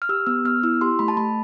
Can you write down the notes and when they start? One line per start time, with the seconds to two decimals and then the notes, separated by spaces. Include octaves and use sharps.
0.02 F6
0.09 G4 E6
0.27 B3 E6
0.45 B3 F6
0.63 E4 E6
0.81 G4 C6
0.99 A3 B5
1.08 A5
1.17 A3 B5